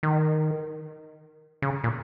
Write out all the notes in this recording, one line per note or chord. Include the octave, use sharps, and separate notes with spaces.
D#3
C#3
A#2